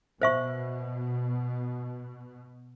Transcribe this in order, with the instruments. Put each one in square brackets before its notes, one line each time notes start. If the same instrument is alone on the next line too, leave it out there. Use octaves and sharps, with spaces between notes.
[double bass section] B2 [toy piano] C5 E5 C#6